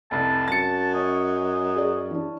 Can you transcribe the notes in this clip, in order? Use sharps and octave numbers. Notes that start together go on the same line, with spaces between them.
F1 C2 A5
F#2 A6 C#7
C#4 D#5
G#4 D5
E3 D4